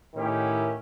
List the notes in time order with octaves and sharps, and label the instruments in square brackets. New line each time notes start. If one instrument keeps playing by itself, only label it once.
[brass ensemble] A2 D#3 C#4 E4 G4